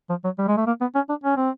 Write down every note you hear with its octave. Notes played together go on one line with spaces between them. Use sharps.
F3
F#3
G3
G#3
A3
A#3
B3
C#4
D4
C#4
C4